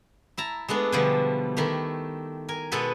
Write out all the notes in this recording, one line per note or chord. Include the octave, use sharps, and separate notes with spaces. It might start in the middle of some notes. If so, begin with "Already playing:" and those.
E4 A5 A#5
G#3 A3 B3 D4
B2 D3 F3 G3 D4
D#3 A3 E4 G4
A#4 G#5
B2 G#3 B3 A4 B4